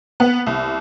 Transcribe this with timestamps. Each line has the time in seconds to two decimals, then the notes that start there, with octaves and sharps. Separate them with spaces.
0.20 B3
0.47 C2